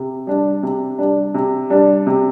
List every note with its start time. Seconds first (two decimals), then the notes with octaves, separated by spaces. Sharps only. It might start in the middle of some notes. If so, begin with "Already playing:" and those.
Already playing: C3
0.27 G3 D4
0.63 C3
0.98 G3 D4
1.34 C3
1.70 G3 D4
2.07 C3